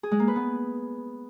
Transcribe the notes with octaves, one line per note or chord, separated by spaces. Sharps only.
G#4
G#3
A#3
B4
B3